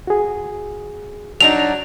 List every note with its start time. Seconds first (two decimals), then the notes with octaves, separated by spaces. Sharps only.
0.07 F#4 G#4
1.41 F#3 D4 D#4 F7